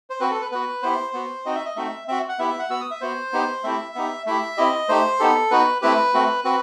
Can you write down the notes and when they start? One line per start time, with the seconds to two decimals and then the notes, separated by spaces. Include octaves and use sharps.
0.10 C5
0.20 C4 F#4 B4
0.31 A4
0.41 B4
0.52 B3 F#4 B4
0.83 B3 E4 G4 C5
1.13 B3 F#4
1.45 C4 D#4 F#4 D#5
1.55 E5
1.65 D#5
1.76 A3 C4 D#4 F#4 E5
2.08 C4 F#4 E5
2.29 F#5
2.39 B3 E4 G4 E5
2.50 E5
2.59 F#5
2.70 B3 F#4 E6
2.81 D#6
2.91 E5
3.01 B3 F#4 C5
3.33 B3 D#4 G4
3.64 A3 C4 E4 G4 E5
3.95 B3 D#4 G4
4.26 A3 E4 G4 E5
4.57 C4 E4 G4 D#5
4.89 A3 D#4 G4 C5
5.19 B3 D#4 G4 A4
5.51 B3 D#4 F#4 B4
5.82 A3 C4 E4 G4 B4
6.14 A3 C4 F#4
6.44 C4 F#4 B4